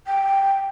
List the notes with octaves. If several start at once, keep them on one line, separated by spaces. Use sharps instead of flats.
G5